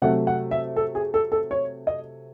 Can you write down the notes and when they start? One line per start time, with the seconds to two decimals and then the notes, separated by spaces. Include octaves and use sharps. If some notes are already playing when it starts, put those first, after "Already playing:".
0.02 C3 F#3 A3 F#5
0.27 F#5
0.51 E5
0.76 A4
0.95 G#4
1.14 A4
1.32 A4
1.51 C#5
1.87 D#5